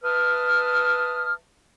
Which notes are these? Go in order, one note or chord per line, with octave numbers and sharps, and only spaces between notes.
B4 E5 A5 D#6 F6